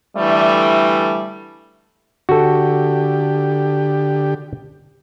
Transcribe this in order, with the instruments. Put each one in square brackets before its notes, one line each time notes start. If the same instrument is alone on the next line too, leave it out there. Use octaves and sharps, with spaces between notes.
[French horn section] D3 E3 G3 A3
[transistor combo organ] D3 G4 [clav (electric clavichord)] F#4 A4